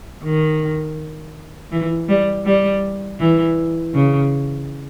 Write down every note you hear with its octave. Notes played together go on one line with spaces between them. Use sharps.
D#3
E3
G3
G3
E3
C#3